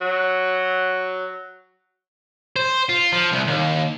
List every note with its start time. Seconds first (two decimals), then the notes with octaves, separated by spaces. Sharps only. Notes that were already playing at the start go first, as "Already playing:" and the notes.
0.01 F#3
2.56 C5
2.89 F4
3.13 F3
3.32 C2
3.47 D#2